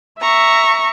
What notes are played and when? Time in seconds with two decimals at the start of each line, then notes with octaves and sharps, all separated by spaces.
0.20 E5 A#5 C#6